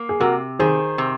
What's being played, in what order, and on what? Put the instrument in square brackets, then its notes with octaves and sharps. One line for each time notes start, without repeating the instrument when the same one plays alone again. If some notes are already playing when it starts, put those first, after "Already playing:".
Already playing: [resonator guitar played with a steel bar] A#3
[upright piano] G#4
[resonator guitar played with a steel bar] C3 [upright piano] F#4 A#4
[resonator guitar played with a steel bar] D#3 [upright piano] G#4 C5
[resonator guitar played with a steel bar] C3